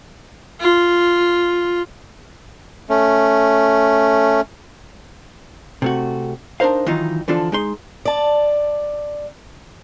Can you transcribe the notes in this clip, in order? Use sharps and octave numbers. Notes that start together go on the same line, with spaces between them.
F4
A3 C#4
C3 A3 F#4
D4 D#4 A#4 C5 F5
D#3 E3 F#3 D#4 F4
D3 E3 F3 D4 F4 A4
G#3 D#4 C6
D5 A5